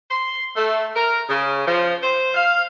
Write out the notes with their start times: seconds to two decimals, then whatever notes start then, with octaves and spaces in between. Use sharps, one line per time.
0.10 C6
0.56 A3
0.95 A#4
1.28 C#3
1.66 F3
2.02 C5
2.34 F5